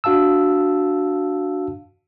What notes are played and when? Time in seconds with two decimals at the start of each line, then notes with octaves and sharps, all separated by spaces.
0.04 D4 F#4 F5 A5 E6